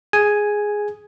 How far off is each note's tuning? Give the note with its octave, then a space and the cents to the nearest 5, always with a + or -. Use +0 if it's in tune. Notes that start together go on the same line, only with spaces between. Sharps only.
G#4 +0 G#5 +0